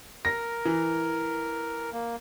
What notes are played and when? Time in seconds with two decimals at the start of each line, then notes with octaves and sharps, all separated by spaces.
0.25 A#4 A#6
0.65 E3
1.93 A#3